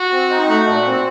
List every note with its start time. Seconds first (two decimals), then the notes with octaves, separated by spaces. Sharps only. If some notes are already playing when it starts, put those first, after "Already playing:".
Already playing: F#4
0.12 C4
0.30 D#4
0.48 A3 F#4
0.67 A#2
0.86 C4